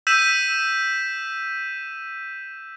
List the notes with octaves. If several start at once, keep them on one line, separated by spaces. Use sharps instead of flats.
E6 G6 B6 D#7 E7